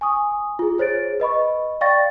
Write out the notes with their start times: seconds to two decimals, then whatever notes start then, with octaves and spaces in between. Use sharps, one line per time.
0.01 G#5 C#6 D#6
0.59 F4 G#4
0.78 G#4 C5 C#5 A6 D7
1.20 B4 D#5 B5 C#6
1.81 D5 F5 G5 C#6 A6 A#6